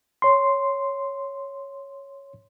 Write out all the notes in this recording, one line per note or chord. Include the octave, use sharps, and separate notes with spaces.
C#5 C6